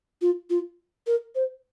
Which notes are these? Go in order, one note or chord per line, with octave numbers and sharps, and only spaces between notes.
F4
F4
A#4
C5